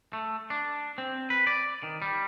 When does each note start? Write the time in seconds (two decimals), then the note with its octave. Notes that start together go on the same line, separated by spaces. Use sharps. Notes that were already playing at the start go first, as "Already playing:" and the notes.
0.13 A3
0.50 D4
0.98 C4
1.30 B4
1.47 D5
1.83 D#3
2.02 G3